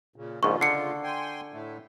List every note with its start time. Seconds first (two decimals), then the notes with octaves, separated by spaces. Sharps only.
0.16 A#2 C#3
0.43 A#1 G#2 C#3 F4 C#6
0.61 D3 C7 C#7
1.03 G5 G#5 C6
1.53 A2 A3